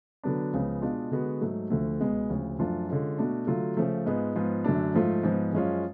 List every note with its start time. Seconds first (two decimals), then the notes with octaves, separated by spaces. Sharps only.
0.24 D3 F#3 B3 D4
0.53 C#2 C#3 F3 B3
0.82 B2 G#3 D4 F4
1.11 D3 G#3 B3 F#4
1.41 G#2 F#3 A3
1.70 D2 D3 F3 A3
2.00 C#2 B2 G#3 B3
2.30 D2 C#3 F3
2.59 F#2 F3 A3 D4 F4
2.89 D3 G#3 C#4 F4
3.18 B2 A3 D4 F#4
3.47 D3 F#3 A3 F4
3.77 C#3 F3 A3
4.06 G#2 G#3 B3 F4
4.35 G#2 F3 B3 F4
4.64 F#2 D3 F#3 A3 D4
4.95 G#2 F3 A3 F4
5.23 G#2 F3 B3
5.53 F#2 F3 G#3 C#4 F4